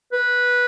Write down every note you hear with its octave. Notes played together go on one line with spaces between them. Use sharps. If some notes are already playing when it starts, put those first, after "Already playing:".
B4